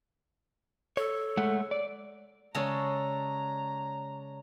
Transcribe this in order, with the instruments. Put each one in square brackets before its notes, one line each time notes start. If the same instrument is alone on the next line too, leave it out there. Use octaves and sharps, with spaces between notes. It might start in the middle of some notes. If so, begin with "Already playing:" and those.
[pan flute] A4 [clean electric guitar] C#5
[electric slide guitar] G#3 A3 F#5
D5
[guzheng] C#3 G#3 A4 [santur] C#5 D5 A5 [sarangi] A#5